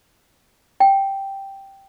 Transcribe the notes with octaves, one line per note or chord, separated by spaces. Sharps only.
G5